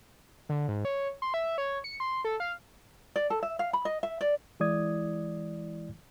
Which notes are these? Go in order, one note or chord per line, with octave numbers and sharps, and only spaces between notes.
D3
G#2
C#5
C6
E5
C#5
C#7
C6
A4
F5
D5
A4
E5
F5
B5
D#5
E5
D5
E3 G#3 E4 D5 D#6 G#6